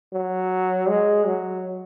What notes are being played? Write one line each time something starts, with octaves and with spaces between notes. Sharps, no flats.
F#3
G#3
F#3